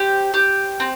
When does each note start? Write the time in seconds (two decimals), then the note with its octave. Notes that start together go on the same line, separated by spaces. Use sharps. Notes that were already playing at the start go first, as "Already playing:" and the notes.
Already playing: G4 C5
0.34 G4
0.80 C4